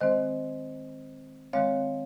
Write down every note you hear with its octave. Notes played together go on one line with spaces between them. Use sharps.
D#3 G#3 C4 C5 D#5
D#3 G#3 C4 C#5 F5